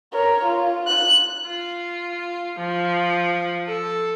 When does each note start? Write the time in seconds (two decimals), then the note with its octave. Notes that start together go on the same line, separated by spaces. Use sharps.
0.13 A#4 C#5
0.45 F4
0.87 F#6
1.46 F4
2.59 F3
3.67 A4